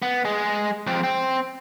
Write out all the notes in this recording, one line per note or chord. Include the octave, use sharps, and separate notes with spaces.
B3
G#3 G#4
F2 C4
C4